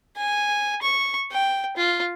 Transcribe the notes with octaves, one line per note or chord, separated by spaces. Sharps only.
G#5
C#6
G5
F4